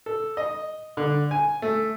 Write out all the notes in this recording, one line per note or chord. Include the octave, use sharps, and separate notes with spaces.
A4
D#5
D3
G#5
A3